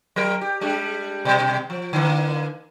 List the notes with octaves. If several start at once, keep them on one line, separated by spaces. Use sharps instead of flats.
F#3 A#4
G4
G3 G#3 D4
B2 G3
F3
D3 E3 A#3